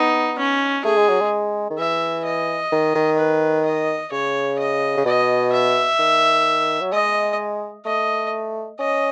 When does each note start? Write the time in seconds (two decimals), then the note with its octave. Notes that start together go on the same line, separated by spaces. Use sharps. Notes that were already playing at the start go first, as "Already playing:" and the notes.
Already playing: B3 D#4
0.38 C#4
0.85 A3 G#4
0.97 G#3
1.09 F#3
1.21 G#3
1.70 D#3
1.78 E3 E5
2.25 D#5
2.72 D#3
2.95 D#3
3.19 B4
3.65 D#5
4.12 C#3 C#5
4.59 D#5
4.97 C#3
5.06 B2 D#5
5.52 E5
5.99 D#3
6.81 F#3
6.92 G#3 D#5
7.85 A3 D#5
8.79 C#4 D#5